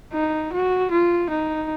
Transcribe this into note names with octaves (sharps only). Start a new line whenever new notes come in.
D#4
F#4
F4
D#4